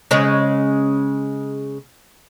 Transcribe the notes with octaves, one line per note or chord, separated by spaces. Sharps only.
C#3 G#3 C#4